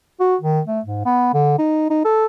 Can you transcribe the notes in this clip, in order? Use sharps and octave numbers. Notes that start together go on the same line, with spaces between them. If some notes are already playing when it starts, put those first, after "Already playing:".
F#4
D#3
A3
G#2
B3
D3
D#4
D#4
A4